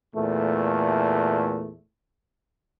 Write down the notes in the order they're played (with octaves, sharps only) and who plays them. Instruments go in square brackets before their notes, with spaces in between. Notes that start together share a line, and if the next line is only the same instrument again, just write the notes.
[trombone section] E2 A#2 A3